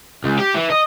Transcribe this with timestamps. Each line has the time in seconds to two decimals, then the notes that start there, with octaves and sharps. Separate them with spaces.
0.24 C#2
0.39 G4
0.55 E3
0.70 D#5